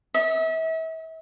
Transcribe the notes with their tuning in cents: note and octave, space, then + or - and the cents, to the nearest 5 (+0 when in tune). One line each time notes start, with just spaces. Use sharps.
E5 -35